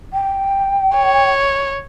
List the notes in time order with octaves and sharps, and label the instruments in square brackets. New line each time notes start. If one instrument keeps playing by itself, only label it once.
[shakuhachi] G5
[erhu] C#5